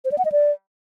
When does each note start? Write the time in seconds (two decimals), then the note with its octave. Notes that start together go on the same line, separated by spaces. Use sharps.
0.05 C5
0.12 D5
0.18 F#5
0.25 D#5
0.32 D5